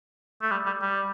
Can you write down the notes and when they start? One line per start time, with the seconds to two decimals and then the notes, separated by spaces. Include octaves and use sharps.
0.42 A3
0.51 G3
0.66 G3
0.82 G3